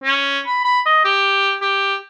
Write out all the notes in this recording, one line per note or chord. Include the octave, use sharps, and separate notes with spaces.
C#4
B5
B5
D#5
G4
G4